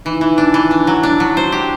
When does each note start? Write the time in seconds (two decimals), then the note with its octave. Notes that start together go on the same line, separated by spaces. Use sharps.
0.05 E3 D#4
0.13 E4
0.21 E3 D#4
0.38 D4
0.54 E3
0.59 F4
0.71 D4 E4
0.83 E4
0.87 F#3 F4
1.03 D4
1.20 F#3
1.37 F#4 C5
1.52 G4